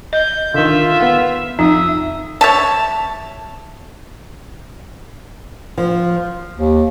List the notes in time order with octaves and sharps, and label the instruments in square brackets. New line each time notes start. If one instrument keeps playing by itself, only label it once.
[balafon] D#5 [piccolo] G6
[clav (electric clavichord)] D3 D#3 [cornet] F4 [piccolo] E5
[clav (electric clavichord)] B3 F#5
[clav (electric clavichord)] F2 [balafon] D#4 [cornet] E5 [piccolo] D#6
[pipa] C#5 E5 A5
[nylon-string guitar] F3
[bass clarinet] D#2